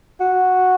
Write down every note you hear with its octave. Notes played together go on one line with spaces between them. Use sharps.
F#4